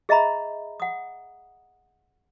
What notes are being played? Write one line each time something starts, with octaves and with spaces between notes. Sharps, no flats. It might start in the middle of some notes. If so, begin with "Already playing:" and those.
G#4 D#5 E5 A#5 B5
F#5 D#6